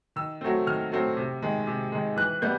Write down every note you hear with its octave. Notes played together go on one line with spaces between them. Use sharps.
D#3 E6
F#3 A3 C4
D#3 F6
F#3 A3 C4
C3
D#3 G#3
C3
D#3 G#3
E3 F#6
G3 B3 G6